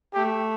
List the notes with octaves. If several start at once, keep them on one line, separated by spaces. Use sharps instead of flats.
A3 G4